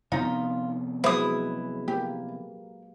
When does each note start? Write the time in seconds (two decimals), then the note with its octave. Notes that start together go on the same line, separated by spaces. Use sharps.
0.12 C3 F3 B3 D#4 F4 A#5
1.04 F#3 G#3 E4 B4 C5 D#6
1.88 A#3 G4